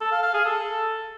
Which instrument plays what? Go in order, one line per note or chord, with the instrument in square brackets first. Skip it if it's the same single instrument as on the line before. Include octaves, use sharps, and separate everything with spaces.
[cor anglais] A4
F5
F5
G#4
A4